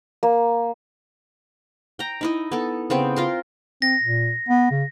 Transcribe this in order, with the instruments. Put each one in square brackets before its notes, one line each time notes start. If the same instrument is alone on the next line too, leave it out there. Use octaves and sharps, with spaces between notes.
[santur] A#3
[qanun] G5 A#5
D#4 E4 D#5
B3 A4
C#3 B3 C4 G5
F4 A#4 C6
[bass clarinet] C4 [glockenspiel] A#6
[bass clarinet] A#2
B3
C#3